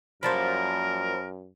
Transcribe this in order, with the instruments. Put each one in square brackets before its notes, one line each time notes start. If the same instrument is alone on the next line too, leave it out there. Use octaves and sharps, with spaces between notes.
[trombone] F#2 [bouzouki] F3 G3 A#3 [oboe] A#4 [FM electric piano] C5 A5 B5